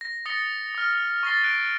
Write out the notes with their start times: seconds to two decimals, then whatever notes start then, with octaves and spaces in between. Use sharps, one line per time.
0.01 A#6
0.26 D#6 A6 A#6 C#7 G7
0.75 D#6 F6
1.23 C#6 F6 A6 A#6 C7 G7
1.44 F#6 D7